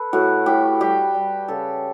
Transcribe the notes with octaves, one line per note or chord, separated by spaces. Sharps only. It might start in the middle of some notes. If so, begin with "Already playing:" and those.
Already playing: A4 B4
A2 F#4
A2 G4
G3 G4
G3
C#3 A4